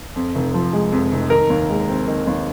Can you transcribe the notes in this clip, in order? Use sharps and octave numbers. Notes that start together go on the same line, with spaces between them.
F2
F1
F3
G#3
F2
F1
D#3 A#4
D#2
G#3
C4
D#3
D#2